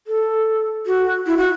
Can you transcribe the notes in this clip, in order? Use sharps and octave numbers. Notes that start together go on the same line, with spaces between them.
A4
F#4
E4
F#4